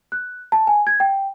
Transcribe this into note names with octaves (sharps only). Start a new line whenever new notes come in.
F#6
A5
G#5
G#6
G5